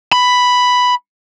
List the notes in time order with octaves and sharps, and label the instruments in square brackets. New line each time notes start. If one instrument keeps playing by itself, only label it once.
[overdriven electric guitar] B5